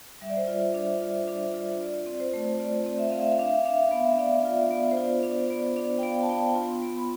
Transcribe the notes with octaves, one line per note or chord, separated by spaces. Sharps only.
G3 E5
D5
C5
F4 D5
D4
F4
D4
F4
F4 D5
C4
C5
A3
F4 D5
C4
E5
C4 F5
E5
F5
D4 E5
F5
D4 E5
F5
B3 E5
E5
D4 D5
F4
D5
B3
C5
F4 D5
D4
D5
B3
D4 D5
G5
B3 F5
A5
B3 G5
F4 C6
B3
B5